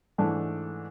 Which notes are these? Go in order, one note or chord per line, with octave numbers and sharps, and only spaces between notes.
G#2 E3 A3 D4